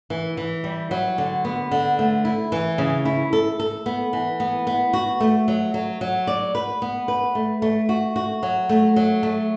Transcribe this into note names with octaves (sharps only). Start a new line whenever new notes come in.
E3
E3
G3
F#3
D3
B3
D3
A3
E4
E3
C#3
E4
A4
A4
B3
E3
B3
B3
F#4
A3
F#3
F#3
F#3
D5
B4
B3
B4
A3
A3
F#4
F#4
F#3
A3
F#3
A3